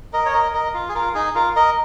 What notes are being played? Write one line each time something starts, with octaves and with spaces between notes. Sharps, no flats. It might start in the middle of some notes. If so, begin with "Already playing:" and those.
A#4 D#5
C#5
A#4 D#5
A#4 D#5
F4
G#4
F4 A#4
D#4 G#4
F4 A#4
A#4 D#5